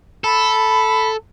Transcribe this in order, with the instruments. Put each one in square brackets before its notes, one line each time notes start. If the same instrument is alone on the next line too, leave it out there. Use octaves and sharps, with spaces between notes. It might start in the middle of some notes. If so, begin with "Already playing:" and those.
[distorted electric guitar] A4 [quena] B5